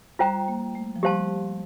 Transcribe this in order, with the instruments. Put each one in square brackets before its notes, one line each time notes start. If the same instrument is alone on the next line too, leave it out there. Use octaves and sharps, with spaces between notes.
[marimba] G3 [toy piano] F4 C5 G5 A#5
[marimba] A#3
A3
F3
[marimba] G3 [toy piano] G4 C5 F5 A5 C6